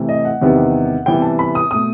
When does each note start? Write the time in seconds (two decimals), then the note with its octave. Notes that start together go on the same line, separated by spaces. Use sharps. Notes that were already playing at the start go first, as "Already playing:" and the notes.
Already playing: C3 E3 A3
0.09 D#5
0.25 F#5
0.41 E2 C3 D#3 G3 B3
1.06 C3 E3 G3 B3 G5
1.22 A5
1.39 B5
1.55 D#6
1.71 B2 A3 D#6